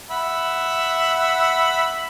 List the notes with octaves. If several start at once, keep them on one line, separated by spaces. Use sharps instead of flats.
E5 F#5 B5